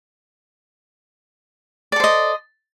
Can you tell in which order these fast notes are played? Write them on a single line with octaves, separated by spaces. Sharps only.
D5 A4 C5 D#5